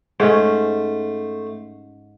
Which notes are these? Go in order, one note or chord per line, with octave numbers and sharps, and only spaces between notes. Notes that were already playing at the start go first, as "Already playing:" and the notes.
G#2 A3 C#4 C5